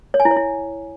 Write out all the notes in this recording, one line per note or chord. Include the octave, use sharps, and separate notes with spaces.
C#5
G#5
E4
C#5
E4